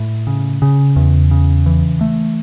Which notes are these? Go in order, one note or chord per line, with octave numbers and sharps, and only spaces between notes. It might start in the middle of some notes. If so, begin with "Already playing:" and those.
Already playing: A2
C#3
C#3
E2
C#3
E3
A3